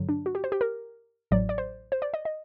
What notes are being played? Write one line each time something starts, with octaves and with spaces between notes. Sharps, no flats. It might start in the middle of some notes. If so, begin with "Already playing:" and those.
Already playing: G2 D3 F#3
D4
F#4
G4
C5
G4
A#4
A1 A2 F#3 D5
D5
C5
C5
D5
D#5
D#5